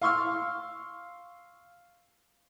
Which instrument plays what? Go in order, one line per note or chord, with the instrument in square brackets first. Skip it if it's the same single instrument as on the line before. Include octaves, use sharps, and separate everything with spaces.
[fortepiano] F5 C6 C#6 E6 F6